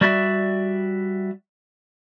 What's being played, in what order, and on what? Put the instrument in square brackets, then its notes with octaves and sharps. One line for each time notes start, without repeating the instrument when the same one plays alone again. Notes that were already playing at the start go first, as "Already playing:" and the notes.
[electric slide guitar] G3 F#4 D5 E5